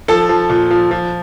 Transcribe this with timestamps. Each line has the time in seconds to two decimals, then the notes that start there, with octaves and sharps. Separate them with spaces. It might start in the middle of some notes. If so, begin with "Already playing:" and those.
0.08 F3 A4 A5
0.29 F3
0.50 A#2
0.71 F3
0.91 F3